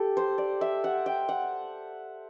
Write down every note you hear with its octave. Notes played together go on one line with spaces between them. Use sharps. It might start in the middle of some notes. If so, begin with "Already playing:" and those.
Already playing: G4 A4
C5
D5
E5
F#5
G5
F#5